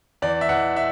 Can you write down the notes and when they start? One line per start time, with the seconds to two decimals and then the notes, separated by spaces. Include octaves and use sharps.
0.22 E2 D5
0.41 E5
0.49 E2 F#5
0.76 E5